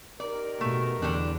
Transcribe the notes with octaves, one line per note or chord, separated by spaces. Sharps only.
D#3 G4 A#4 D5
B2 A3
E2 D3 G3 D4